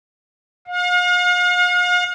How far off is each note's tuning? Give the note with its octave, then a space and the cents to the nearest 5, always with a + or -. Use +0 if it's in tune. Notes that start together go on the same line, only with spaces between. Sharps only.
F5 +40